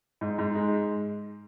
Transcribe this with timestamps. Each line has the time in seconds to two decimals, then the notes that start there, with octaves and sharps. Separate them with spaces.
0.21 G#2
0.38 G#2
0.55 G#3